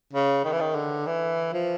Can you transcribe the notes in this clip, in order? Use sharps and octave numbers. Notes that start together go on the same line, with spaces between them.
C#3
D#3
E3
D#3
D3
E3
F3